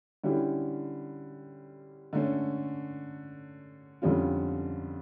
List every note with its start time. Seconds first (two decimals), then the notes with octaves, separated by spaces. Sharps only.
0.24 D3 G3 C#4 E4 G4
2.13 D3 A3 C#4
4.02 F2 D3 G3 C#4 F4